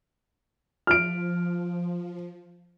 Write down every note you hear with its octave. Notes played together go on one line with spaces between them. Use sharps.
F3 F6 D7